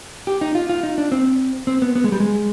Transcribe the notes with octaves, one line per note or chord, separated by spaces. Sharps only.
G4
D#4
F4
F4
D#4
D4
C4
C4
B3
B3
G#3
G3
G#3